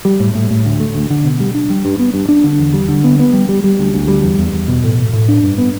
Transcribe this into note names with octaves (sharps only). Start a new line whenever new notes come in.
G3
A2
A2
A2
D2
A3
D2
D3
B2
G3
D4
G3
G2
B3
G2
D4
D3
E2
G3
D3
B3
B3
G3
G3
G3
D2
D2
G3
E2
E2
E2
B2
A2
A2
A2
D4
G2
B3